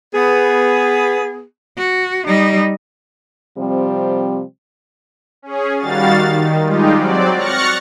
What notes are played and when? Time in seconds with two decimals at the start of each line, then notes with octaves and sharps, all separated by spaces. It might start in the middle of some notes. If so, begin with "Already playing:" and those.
0.14 B3 G#4
1.77 F#4
2.27 G3 D#4
3.57 C3 F3 G3 C4
5.42 C#4 G#4
5.78 D#3 G3 F#4 F5 A6
6.27 D#3
6.65 G3 G#3 D#4 F4 G4
6.94 F#3 C4 D5
7.35 C#6 F6 F#6 A6 A#6 C#7